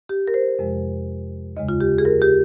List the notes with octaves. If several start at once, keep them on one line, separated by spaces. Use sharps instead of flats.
G4
A#4
C5
F2 C3 F3 G#3
D#2 C#3 G#3 D#5
F4
G4
G#4
A#4
G4